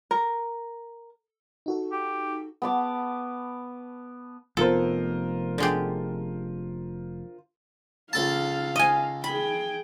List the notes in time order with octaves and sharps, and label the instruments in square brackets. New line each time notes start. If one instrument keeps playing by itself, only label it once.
[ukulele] A#4
[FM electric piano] D#4 F#4 A4
[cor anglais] G4
[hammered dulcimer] B3 A5 D6
[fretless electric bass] F1 F2 B3 [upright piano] F4 A#4 C5 [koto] A4
[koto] D3 G#3 G4
[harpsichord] C#2 A4 A5 [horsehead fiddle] F5
[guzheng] D#5 G#5
[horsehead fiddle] G#4 G5 [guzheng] B5